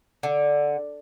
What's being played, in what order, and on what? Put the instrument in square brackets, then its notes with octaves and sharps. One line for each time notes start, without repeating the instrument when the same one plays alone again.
[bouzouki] D3